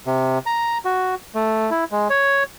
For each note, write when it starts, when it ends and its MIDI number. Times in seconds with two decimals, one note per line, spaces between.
0.07 0.38 48
0.46 0.78 82
0.85 1.15 66
1.35 1.70 57
1.71 1.84 64
1.92 2.08 56
2.10 2.43 73